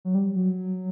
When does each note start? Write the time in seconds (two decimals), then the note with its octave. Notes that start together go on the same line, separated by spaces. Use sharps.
0.05 F#3
0.15 G3
0.36 F#3